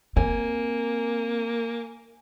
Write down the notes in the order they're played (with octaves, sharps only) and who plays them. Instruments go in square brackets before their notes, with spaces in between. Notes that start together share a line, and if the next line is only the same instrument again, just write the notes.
[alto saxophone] A#3 [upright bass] C4 [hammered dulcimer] G#5